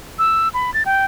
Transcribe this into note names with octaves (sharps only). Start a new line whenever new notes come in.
E6
B5
A6
G5